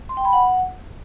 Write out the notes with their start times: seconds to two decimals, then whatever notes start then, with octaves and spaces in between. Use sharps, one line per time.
0.09 C6
0.17 G5
0.25 B5
0.33 F#5